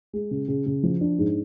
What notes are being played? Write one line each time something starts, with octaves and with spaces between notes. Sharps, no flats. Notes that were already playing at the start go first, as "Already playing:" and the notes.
G#3
C#3
C#3
C#3
F3
D4
G#2